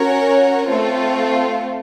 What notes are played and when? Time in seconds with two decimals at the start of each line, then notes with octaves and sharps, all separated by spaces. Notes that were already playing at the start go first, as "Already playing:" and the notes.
Already playing: C#4 F#4 A#4 C#5
0.66 A3 C4 F4